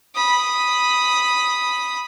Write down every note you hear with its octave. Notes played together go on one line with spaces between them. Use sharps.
B5 D#6